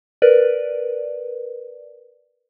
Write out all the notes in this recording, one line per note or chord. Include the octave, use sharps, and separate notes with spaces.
A#4 B4 D5